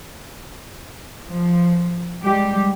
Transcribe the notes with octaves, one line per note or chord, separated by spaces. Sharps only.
F3
G3 G#3 G4